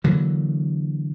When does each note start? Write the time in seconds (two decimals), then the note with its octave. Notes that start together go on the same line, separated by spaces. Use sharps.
0.04 D3 E3 F#3 A#3